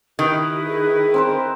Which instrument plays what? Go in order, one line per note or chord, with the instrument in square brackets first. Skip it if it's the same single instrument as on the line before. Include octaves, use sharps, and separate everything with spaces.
[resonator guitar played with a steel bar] D#3 [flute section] E4 B4 D#5 [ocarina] G4
[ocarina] G#4
[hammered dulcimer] C4 A#4 C5